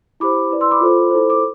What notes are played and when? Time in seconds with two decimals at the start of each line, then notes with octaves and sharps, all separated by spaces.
0.20 E4 G4 C5 B5 D6
0.51 E4 B4 D5
0.61 C6 E6
0.71 B5 D6
0.81 F4 A4 C5
1.11 E4 A4 C5
1.30 D6